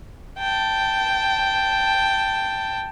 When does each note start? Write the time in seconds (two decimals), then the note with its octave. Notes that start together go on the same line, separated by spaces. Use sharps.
0.39 G5 A5